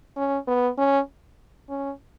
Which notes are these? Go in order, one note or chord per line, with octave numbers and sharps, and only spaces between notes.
C#4
B3
C#4
C#4